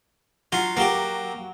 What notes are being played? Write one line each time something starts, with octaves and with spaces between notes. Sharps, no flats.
F#3 F4
F#3 A#3 G4